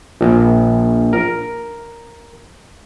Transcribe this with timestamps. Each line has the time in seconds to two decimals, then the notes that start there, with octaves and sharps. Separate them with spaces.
0.21 A#1
1.13 A#4